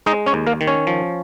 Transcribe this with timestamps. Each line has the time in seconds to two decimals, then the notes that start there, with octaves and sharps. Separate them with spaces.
0.06 G#3 D#4 D#5
0.26 C#4 C#5
0.34 D#2
0.47 A#3 A#4
0.61 D#3
0.67 C#4 C#5
0.87 F3